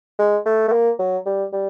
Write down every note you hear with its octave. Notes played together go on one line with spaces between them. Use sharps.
G#3
A3
A3
A#3
F#3
G3
G3